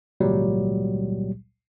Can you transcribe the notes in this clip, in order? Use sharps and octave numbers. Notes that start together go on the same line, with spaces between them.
G#1 C#2 A#2 F#3 G3